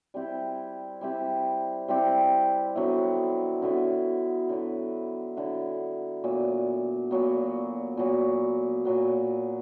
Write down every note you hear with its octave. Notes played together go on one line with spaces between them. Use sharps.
G3 C4 E4 G4
G3 C4 E4 G4
G3 C4 E4 G4
D3 F#3 B3 E4
D3 F#3 B3 E4
D3 F#3 B3 E4
D3 F#3 B3 E4
A#2 F#3 B3
A#2 F#3 B3
A#2 F#3 B3
A#2 F#3 B3